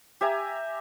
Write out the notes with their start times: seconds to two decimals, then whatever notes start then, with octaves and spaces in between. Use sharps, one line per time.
0.21 G4 E5 G#5 A#5